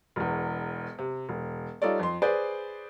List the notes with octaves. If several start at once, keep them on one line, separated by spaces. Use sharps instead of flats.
E1 E2
C3
E1
G3 D#4 F4 A4 C#5 D5
F2 C6
G#4 B4 C5 D5